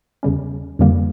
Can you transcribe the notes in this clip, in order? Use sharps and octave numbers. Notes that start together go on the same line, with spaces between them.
E2 C#3 G3 C#4
F2 D3 G3 A#3